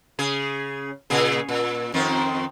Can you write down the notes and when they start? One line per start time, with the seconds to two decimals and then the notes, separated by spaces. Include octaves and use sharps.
0.19 C#3 G#4
1.10 A#2 C#3 G#4
1.49 A#2
1.94 F2 D#3 C4